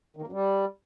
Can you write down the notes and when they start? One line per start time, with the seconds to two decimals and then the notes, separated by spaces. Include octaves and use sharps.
0.17 D#3
0.22 A#3
0.27 F#2
0.32 G3